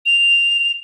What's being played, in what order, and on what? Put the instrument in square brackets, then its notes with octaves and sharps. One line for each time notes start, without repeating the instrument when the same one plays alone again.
[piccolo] F7